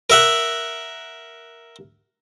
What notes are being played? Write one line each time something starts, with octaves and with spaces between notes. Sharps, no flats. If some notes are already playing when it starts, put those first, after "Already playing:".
A#4 E5 F#5